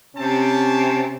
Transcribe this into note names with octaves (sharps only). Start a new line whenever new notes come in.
C3 C4 C#4 A5